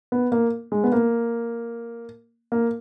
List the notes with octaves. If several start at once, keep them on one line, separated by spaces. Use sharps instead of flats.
B3
A#3
G#3
B3
A#3
A#3